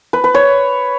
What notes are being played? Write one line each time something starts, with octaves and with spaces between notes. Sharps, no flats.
B4
B4
C#5